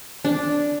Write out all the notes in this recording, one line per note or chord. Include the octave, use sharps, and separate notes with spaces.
D4